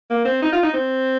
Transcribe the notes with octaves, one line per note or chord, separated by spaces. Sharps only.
A#3
C4
D#4
F4
D#4
C4